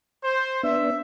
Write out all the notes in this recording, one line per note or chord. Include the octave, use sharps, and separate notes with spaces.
C5
B3 D4 E5